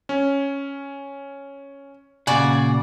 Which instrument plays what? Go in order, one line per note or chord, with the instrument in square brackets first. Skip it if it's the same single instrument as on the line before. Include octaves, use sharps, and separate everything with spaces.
[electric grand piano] C#4
[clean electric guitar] A#2 C#3 [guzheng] F#4 D5 [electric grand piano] G#5